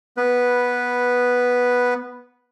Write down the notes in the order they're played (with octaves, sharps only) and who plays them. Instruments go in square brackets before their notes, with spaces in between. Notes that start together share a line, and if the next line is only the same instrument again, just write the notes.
[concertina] B3 B4